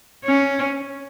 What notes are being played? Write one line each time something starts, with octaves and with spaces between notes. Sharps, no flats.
C#4